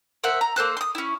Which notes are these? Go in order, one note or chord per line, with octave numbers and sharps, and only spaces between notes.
A#4 C5 E5 F#5
A#5
A#3 A4 C5 F#6
C6 D#6
C#4 E4